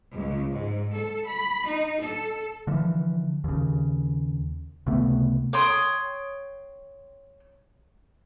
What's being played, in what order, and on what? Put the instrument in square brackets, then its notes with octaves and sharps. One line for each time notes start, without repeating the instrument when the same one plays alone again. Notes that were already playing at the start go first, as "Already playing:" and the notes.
[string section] C#2
G#2
A4
B5
D#4
A4
[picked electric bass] D3 E3 F3
D#2 C#3
C#2 C3 A3 B3
[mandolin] C#5 G5 C6 D#6